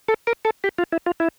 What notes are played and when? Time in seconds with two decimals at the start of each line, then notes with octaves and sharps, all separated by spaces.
0.08 A4
0.27 A#4
0.45 A4
0.64 G4
0.78 F4
0.92 E4
1.06 F4
1.20 E4